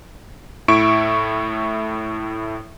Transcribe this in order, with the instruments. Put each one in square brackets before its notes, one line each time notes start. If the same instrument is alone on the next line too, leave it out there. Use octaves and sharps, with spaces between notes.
[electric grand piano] A2 E4 E5 C#6 D7